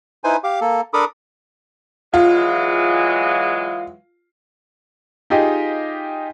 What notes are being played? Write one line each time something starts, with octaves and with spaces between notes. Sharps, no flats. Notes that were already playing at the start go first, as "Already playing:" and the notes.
D#4 E4 B4 C5 G#5
G4 F5 D6
A#3 A4
D4 A4 A#4 B5 D6 D#6
E3 F#3 G#3 F4
D#4 F4 G4 G#4 D#5